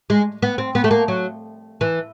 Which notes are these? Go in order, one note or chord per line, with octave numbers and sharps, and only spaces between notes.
G#3
B3
C4
B3
A3
A#3
F#3
E3